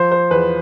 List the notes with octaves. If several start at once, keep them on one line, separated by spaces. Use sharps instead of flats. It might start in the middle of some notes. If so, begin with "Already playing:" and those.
Already playing: F3 C5
C5
E2 B4